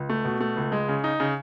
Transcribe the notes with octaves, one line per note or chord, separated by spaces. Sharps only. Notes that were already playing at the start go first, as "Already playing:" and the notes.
Already playing: C#2
A3
B2
A3
C#2
G#3
C#3
D#4
C#3